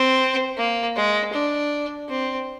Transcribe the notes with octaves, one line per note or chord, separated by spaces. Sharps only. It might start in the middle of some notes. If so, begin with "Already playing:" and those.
Already playing: C4
A#3
G#3
D4
C4